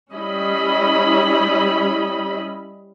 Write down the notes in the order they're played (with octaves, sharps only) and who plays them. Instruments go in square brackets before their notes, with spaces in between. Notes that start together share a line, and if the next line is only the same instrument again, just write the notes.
[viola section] G3 C#4 E4 D#5 B5